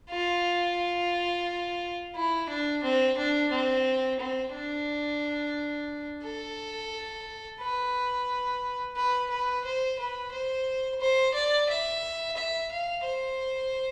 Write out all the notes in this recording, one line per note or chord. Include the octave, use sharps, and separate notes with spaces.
F4
E4
D4
C4
D4
C4
C4
D4
A4
B4
B4
B4
C5
B4
C5
C5
D5
E5
E5
F5
C5